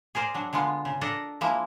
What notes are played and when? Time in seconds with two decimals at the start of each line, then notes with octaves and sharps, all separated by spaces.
0.15 G#4 A#4 C5 D5
0.34 F#3 D4
0.53 D3 G#3 B3 F4
0.85 C#3
1.01 D4 A4 A#4 D5 D#5
1.41 F3 G#3 A#3 E4